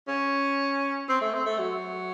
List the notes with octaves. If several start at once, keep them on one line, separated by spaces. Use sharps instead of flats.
C#4
C4
A3
C4
A3
F#3